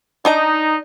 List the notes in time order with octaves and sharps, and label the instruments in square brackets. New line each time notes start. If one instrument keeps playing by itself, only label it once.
[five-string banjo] D4 D#5 A#5 [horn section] D#4